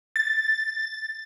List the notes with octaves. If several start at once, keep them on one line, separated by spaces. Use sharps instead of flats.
A6